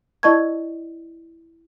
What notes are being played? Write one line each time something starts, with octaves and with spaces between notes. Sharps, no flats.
E4 D5 D#5 A5 C#6 G#6